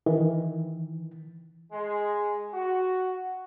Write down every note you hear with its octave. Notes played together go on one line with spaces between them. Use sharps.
D#3 E3
G#3
F#4